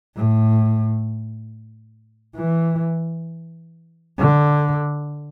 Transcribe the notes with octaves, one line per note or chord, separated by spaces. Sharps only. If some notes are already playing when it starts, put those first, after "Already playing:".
A2
E3
D3